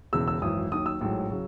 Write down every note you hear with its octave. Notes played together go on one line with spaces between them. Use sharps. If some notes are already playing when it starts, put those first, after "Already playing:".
E1 E2 C#3 E3 E6
E6
G#1 F#2 E3 D#6
D#2 D#3 F#3 D#6
E6
A1 G#2 F#3
C#3 F#3